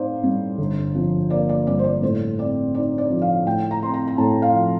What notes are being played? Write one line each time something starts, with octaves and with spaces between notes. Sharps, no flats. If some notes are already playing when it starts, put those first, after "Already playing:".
Already playing: A2 C4 D#4 C5 D5 F5
G3
G1
F3
A#3 D5
D5
G2 D5
C5
D5
A2 C5
C4 D5
D#4 D5
D5
F3
F5
A2 G5
A#5
C4 C6
A#5
A#5
A2 A5
F5
F3